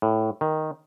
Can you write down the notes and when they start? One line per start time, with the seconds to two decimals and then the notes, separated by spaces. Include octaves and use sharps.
0.02 A2
0.41 D#3